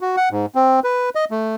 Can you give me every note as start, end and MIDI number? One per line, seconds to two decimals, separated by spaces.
0.01 0.16 66
0.17 0.29 78
0.31 0.46 44
0.55 0.80 60
0.84 1.10 71
1.15 1.25 75
1.31 1.56 57